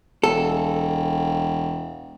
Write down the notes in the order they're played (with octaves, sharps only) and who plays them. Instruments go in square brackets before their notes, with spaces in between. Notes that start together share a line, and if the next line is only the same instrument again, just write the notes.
[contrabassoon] E1 [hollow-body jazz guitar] A4